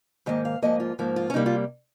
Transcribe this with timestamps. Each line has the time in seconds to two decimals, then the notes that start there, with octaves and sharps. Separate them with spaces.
0.26 G#2 D#3 A#3 D#5
0.45 F5
0.62 G#2 F3 A#3 D#5
0.80 F4
0.99 G#2 F3 A#3
1.16 F4
1.30 C#4
1.34 C3 G3 A#3 D#4
1.46 F4